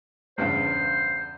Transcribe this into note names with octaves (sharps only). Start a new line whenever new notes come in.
E2 G2 C#3 C5